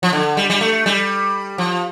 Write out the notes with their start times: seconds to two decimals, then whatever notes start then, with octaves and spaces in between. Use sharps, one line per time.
0.03 F3
0.13 D3
0.37 G3
0.50 G3
0.61 A3
0.86 G3
1.58 F3